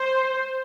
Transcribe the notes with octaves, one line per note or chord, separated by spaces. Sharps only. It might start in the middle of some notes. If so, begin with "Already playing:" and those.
Already playing: C5